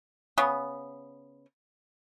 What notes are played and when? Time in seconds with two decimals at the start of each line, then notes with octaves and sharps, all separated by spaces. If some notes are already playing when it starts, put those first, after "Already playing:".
0.38 C#3 B3